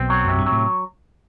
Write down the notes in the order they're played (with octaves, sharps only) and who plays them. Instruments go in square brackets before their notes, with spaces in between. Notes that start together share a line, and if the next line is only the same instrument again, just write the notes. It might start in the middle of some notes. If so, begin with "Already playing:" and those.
Already playing: [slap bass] B1 B2 [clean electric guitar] C4
[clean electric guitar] F#3
[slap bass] F#2 [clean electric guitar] C3
[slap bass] G2
[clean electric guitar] F#3
[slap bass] A2